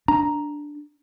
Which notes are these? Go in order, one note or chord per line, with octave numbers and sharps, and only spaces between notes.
D4 A#5